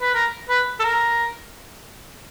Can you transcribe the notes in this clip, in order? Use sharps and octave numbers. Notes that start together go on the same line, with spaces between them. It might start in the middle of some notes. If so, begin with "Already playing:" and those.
B4
A#4
B4
A4
A#4